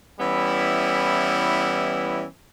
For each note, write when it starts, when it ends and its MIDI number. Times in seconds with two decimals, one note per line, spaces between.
0.20 2.25 52
0.20 2.25 55
0.20 2.25 59
0.20 2.25 61
0.20 2.25 64